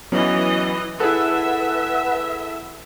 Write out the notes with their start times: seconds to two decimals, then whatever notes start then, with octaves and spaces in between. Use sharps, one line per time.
0.12 E3 F#3 B3 C#4 D#5
1.00 E4 G#4 A4 B4 E5 F#5